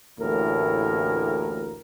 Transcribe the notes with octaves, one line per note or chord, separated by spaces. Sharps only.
A1 D2 A2 A#3 A#4